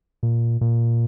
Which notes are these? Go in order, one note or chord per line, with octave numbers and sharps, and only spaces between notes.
A#2
A#2